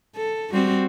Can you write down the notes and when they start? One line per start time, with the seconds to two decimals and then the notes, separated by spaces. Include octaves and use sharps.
0.16 A4
0.53 G3 C4 F#4